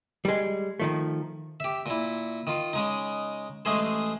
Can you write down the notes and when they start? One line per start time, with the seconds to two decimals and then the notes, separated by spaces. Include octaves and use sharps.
0.25 G3 G#3
0.80 D#3 F3 A3
1.60 G4 E5
1.86 A#2 E4
2.47 D#3 F4
2.73 C#3 G#3 D#4
3.65 A1 G#3 A3 G#4 C5